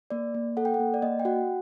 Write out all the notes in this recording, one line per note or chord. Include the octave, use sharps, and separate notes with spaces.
A#3 D5
A#3
A4 F#5
G5
F#5
A#3
D5
A#3 D#5
G5
F#4 F#5